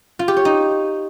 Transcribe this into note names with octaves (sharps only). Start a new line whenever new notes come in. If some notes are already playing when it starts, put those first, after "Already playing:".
F4
G4
C#5
D#4